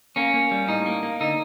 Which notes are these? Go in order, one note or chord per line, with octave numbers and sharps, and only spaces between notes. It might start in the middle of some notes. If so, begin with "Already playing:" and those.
A#3 C#4
A#3
G3
A2 D#4
A#3
A#3
D3 D#4